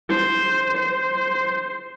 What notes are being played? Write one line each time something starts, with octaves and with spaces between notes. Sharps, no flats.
C5
C5